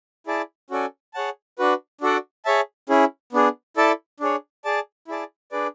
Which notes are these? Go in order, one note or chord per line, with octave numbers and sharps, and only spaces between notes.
E4 G#4 D5 A5
C#4 F#4 A4 D5 G#5
G#4 C#5 F#5 A5
D4 F#4 B4
D4 F#4 A4 D5 F#5
G#4 C#5 E5 A5
C#4 E4 G#4
B3 D4 G#4
E4 A4 D5 A5
D4 G#4 C#5
G#4 D5 A5
E4 G#4 D5 A5
D4 G#4 B4 D5